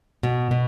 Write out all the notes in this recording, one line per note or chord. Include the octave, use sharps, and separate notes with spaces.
B2
B2